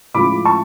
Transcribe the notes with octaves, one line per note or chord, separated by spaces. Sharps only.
A2 F3 G#3 B5 D6
A5 C#6